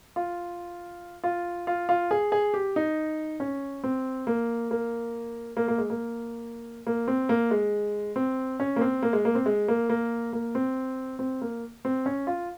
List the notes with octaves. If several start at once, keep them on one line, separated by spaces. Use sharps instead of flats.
F4
F4
F4
F4
G#4
G#4
G4
D#4
C#4
C4
A#3
A#3
A#3
A#3
G#3
A#3
A#3
C4
A#3
G#3
C4
C#4
A#3
C4
A#3
G#3
A#3
C4
G#3
A#3
A#3
A#3
C4
C4
A#3
C4
C#4
F4